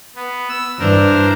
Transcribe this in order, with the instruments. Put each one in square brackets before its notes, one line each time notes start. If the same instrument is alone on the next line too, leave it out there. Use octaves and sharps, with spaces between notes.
[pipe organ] B3
E6
[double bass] G2 E3 [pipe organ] D4 A#4 C5